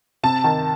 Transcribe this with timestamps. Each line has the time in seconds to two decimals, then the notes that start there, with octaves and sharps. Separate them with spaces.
0.23 C3 A5
0.44 D#3